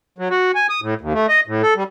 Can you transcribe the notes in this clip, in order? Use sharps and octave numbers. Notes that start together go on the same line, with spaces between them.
F#3
F#4
G#5
D#6
A2
D#2
A3
D#5
A2
A4
G3